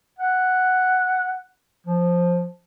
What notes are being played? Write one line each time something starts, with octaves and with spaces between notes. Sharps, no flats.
F#5
F3